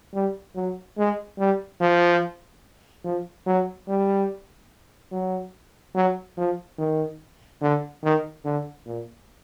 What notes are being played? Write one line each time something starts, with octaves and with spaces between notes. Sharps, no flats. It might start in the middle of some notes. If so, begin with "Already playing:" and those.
G3
F#3
G#3
G3
F3
F3
F#3
G3
F#3
F#3
F3
D#3
D3
D#3
D3
A#2